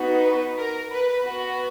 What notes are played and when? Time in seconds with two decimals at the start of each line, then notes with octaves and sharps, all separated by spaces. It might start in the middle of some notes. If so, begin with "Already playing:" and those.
Already playing: B3 D#4 F#4
0.23 B4
0.57 A#4
0.91 B4
1.24 B3 F#4